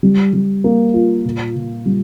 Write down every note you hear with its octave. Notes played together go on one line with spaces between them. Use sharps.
G3
G3
A#3
F4
A#2
A#2
G3